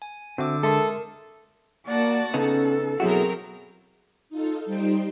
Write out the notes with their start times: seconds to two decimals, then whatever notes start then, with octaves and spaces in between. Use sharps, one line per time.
0.02 G#5
0.38 D3 C4 D4 F#4 E5 D6 E6
0.63 G#3 A4 A#4 E5 C6 D#6
1.87 A#3 F#4 D5 F#5 A5
2.34 C#3 B3 C#4 D#4 A4
3.00 B2 F#3 C4 E4 F#4 G#4 A#4
4.30 D#4 F4 A4
4.66 G3 D#4 C5 G5